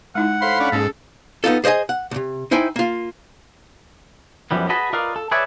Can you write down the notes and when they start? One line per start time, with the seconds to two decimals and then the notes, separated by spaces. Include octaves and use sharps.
0.15 G#3 D#4 E4 F#5
0.42 A2 C5 F5 B5 C6
0.60 C#4 D4
0.72 G#2 A#3 C#4 G#4 A4
1.44 B3 D#4 F4 A4
1.64 G#4 C5 D5 D#5 G#5
1.89 F#5
2.11 B1 C3
2.51 D#4 E4 C5 G5 G#5
2.76 A#3 F4
4.51 F#2 E3 F3 G3 B3
4.69 F#4 G#4 B4 D#5 A5 B5
4.93 F4 A#4 B4 D5 D#5 F5
5.16 A4
5.31 G#4 B4 C#5 D5 E5 A5